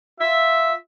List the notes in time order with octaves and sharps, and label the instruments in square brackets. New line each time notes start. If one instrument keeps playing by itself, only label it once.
[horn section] F4 E5